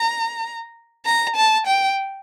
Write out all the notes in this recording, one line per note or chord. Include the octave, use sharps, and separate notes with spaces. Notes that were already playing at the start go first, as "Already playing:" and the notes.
Already playing: A#5
A#5
A5
G5